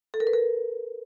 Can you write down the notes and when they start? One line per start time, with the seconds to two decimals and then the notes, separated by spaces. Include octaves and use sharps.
0.14 A4
0.20 A#4
0.27 B4
0.33 A#4